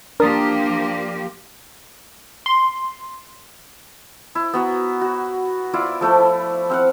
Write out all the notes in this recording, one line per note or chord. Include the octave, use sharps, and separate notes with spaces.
F3 A#3 D4 G4 A#4 A5 D#6
C6
E4
B3 F#4 A#5
F#4
E4 F4 D5
F3 A3 E4
C4 F5 F#5